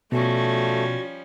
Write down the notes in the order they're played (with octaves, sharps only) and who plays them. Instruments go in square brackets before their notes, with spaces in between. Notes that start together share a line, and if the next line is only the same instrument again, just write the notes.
[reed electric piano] B2 [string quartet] F3 G3 C#4 [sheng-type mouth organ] A3 [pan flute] F#4